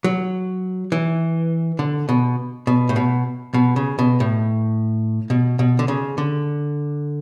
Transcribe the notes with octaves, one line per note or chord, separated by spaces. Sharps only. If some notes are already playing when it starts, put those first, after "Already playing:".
F#3
E3
D3
B2
B2
A2
B2
B2
C#3
B2
A2
B2
B2
D3
C#3
D3